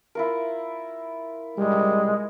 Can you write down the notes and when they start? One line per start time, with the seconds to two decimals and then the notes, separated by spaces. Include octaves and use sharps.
0.15 E4 F4 A#4
1.58 G3 G#3